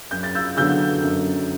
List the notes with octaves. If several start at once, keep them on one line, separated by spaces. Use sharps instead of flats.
F#2 G6
A6
E6 G6
D3 F#3 B3 D4 E6 G6
F#2